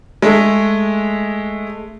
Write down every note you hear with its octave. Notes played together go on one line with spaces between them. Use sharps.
G#3 A3